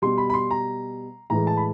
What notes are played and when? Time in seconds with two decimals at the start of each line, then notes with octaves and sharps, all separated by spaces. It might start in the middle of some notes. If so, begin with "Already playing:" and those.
0.02 B2 G3 C6
0.18 B5
0.30 B5
0.34 C6
0.51 A#5
1.30 A2 E3 G#3 A#5
1.47 A5
1.57 B5